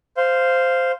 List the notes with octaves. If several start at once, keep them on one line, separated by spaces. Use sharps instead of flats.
C5 F5